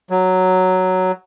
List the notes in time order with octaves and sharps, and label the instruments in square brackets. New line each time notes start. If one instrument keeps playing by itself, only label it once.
[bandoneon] F#3